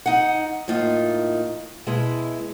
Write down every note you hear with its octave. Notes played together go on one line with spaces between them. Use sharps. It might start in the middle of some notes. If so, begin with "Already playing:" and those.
D#4 F#5
A2 A#3 D#4 F4
B2 G#3 E4